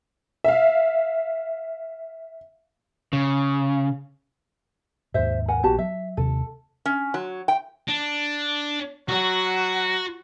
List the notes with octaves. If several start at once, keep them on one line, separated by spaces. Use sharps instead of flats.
E5 F5
C#3
D#2 G#2 C5 E5
A#4 F#5 G#5
A#1 B3 F#4 G4 A5
F#3 E5
D#2 C3 A4
C#4
F#3
G5
D4
F#3 F#4